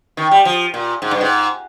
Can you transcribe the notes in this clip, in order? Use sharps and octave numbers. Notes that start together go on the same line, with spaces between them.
D#3
G3
F3
A#2
G#2
G2
G#2